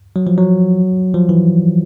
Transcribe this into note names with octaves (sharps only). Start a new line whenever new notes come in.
F#3
F3
F#3
F3
E3